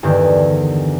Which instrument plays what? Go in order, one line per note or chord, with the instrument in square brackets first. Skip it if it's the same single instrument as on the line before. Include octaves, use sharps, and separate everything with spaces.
[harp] E2 G2 D3 D#3 G4